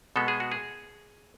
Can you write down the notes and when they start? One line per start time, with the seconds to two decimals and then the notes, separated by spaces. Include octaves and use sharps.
0.16 B2 G#3 B3 A4
0.28 G#4
0.40 F#4
0.52 G#4